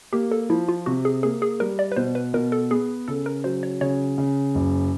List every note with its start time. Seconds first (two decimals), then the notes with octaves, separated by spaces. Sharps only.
0.13 A#3 G4
0.32 A4
0.49 F3 E4
0.68 F4
0.86 C3 F#4
1.05 G#4
1.23 A#3 G#4
1.42 G#4
1.60 G3 A#4
1.79 D5
1.92 B4
1.96 B2 C5
2.15 B4
2.33 B2 A#4
2.52 A4
2.71 B3 G#4
3.08 C#3 A4
3.26 A#4
3.44 F#3 C5
3.63 C#5
3.81 C#3 C#5
4.18 C#3
4.55 F#1